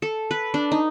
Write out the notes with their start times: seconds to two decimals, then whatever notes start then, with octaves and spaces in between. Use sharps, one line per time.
0.02 A4
0.31 B4
0.54 D4
0.72 D#4